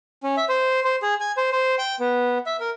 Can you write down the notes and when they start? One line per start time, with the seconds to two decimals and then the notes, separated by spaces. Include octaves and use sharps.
0.23 C#4
0.37 E5
0.49 C5
0.84 C5
1.02 G#4
1.21 G#5
1.37 C5
1.52 C5
1.78 G5
2.00 B3
2.46 E5
2.60 A#4